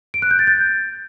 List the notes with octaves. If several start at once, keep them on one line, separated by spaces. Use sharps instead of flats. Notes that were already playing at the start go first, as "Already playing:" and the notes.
D7
F#6
G6
A6
G6